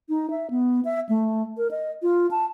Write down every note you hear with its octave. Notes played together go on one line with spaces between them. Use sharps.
D#4
E5
B3
E5
A3
A#4
D#5
F4
A5